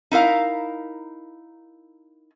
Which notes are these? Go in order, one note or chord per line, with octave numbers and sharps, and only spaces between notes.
D#4 E4 A#4 F5